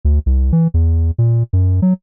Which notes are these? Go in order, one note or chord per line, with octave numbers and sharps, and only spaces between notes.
D2
C2
E3
E2
A#2
F#2
F#3